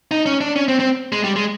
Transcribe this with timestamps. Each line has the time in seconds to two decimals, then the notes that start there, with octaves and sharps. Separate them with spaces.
0.11 D#4
0.26 C#4
0.41 D4
0.56 C#4
0.68 C4
0.80 C4
1.12 G#3
1.24 G3
1.36 G#3